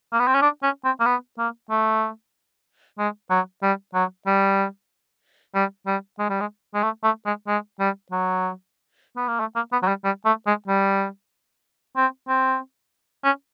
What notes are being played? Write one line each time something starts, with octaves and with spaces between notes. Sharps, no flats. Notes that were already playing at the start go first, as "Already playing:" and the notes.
A#3
B3
C4
C#4
D4
C#4
C4
A#3
B3
A#3
A3
G#3
F#3
G3
F#3
G3
G3
G3
G#3
G3
G#3
G#3
A3
A3
G#3
G#3
G3
F#3
B3
A#3
A3
A#3
B3
F#3
G3
G3
A3
G#3
G3
C4
C4
C#4